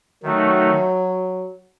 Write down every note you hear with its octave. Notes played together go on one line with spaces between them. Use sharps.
D#3 F#3 A3 D#4 F#4